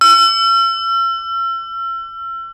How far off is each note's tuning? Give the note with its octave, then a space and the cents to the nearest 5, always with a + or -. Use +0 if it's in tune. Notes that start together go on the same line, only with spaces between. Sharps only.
E6 +40